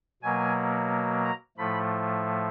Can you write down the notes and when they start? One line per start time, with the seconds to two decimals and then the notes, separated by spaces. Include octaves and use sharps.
0.22 B2 F#3 A#3 G#5
1.24 A#5
1.58 A2 F3 A3 B5